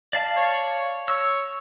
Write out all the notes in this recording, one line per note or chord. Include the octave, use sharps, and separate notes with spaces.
D5 F5 A5
C#5
C#5 E6